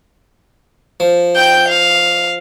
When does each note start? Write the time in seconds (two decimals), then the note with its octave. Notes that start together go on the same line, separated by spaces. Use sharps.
1.00 F3
1.36 G5 G6
1.68 F5